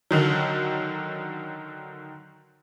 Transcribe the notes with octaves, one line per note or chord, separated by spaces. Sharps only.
D3 D#3 F#3